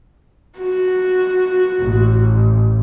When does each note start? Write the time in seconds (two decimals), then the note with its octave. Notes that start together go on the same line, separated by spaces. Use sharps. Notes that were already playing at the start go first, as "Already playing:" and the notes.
0.59 F#4
1.80 A1